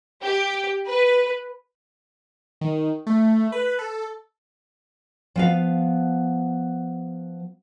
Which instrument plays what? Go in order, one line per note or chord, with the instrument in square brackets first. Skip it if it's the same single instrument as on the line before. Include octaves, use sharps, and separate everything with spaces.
[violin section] G4
B4
[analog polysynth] D#3
A3
B4
A4
[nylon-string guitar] F3 B3 F5